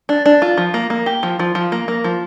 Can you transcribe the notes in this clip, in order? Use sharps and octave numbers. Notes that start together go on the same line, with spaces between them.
D4
D4
F4
F3
A#3
A#3
G4
F3
F3
F3
A#3
A#3
F3